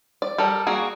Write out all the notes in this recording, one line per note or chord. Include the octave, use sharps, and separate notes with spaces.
D5
G3 A4 A#4
G3 A#3 F#4 G#4